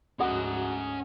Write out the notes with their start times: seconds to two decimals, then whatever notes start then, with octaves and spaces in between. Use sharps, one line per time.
0.20 D2 G#2 C#4 F#4 D#5 F#5 A#5 D#6